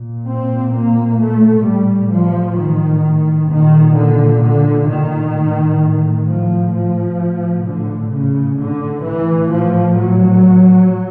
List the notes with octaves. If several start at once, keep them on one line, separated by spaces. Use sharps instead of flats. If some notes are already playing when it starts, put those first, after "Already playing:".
Already playing: A#2
C4
A#3
A3
A2 G3
F3
D#3
A#2 D#3
D3
D3
D#3
A2
F3
F3
A2
D3
C#3
D3
A2 E3
F3
F#3